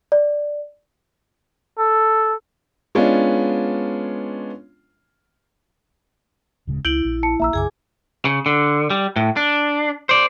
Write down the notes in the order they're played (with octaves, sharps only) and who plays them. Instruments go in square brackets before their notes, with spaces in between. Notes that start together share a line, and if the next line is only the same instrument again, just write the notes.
[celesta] D5
[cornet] A4
[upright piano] G#3 B3 C#4 D4 F4
[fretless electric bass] D1 C#3 G#3
[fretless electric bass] C#2 [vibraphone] E4 [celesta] G6 D7 F#7
[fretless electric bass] A#1
[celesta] A5 C#7
[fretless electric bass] A#1 A#3 [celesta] E5 A#5 E6
[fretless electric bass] B1 F#2 C#3 [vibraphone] G#4 G#5 D6
[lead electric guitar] C#3
D3
G3
A2
D4
C5 D5